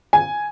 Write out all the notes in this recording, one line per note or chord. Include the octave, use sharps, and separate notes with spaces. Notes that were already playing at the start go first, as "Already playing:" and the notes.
G#5